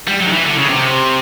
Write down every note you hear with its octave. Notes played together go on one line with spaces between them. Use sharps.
G3
F#3
D#3
E3
D3
C#3
C3